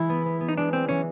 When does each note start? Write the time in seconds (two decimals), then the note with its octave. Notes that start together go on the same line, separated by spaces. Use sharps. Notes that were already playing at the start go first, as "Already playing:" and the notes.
Already playing: E3 G#3 E4
0.09 B3
0.26 B3
0.40 B3
0.49 D#4
0.57 G#3 D4
0.73 C4 D4
0.89 E3 C#4